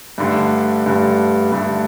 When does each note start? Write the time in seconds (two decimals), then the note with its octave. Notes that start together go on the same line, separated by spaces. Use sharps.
0.18 G2 D3 A3
0.86 G2 D3 A3
1.52 G2 D3 A3